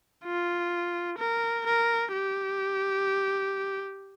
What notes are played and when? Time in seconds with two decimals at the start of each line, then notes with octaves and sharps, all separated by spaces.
0.24 F4
1.18 A#4
1.66 A#4
2.13 G4